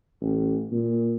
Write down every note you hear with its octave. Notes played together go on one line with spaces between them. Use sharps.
A1
A#2